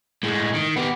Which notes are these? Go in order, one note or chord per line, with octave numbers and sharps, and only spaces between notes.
A2 G#3
D#3
B3 G4